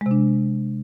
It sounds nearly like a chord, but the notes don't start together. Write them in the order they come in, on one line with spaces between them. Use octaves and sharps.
G#3 C3 D4